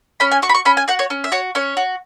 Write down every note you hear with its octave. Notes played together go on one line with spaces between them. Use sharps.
C#4 B5
G#5
F#4 C#6
B5
C#6
C#4 B5
G#5
F#4 F#5
C#5
C#4
E5
F#4 C#5
C#4 C#5
F#4